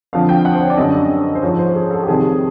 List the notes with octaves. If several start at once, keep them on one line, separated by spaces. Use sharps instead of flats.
F2 D3 F3 F5
G5
F#5
C5
C#5
D5
F#2 D3 G3 D#5
C5
G#2 F3 C#5
C5
G#4
A4
G4
F2 C3 D#3 G3 G#4